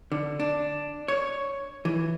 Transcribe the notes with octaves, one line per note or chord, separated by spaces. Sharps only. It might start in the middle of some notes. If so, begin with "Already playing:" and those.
D3
D4
C#5
E3